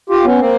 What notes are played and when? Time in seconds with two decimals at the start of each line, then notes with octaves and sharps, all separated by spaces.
0.10 F4 G4
0.24 B3 C#4
0.39 A#3 C4